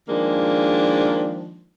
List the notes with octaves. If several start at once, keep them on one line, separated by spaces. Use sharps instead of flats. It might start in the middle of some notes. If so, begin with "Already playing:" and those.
D#3 F3 G#3 A#3 D4